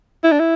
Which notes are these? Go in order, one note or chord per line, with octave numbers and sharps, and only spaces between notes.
E4
D4
E4